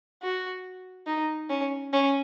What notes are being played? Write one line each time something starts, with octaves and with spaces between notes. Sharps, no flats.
F#4
D#4
C#4
C#4